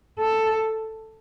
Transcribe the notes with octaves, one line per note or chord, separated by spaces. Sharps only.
A4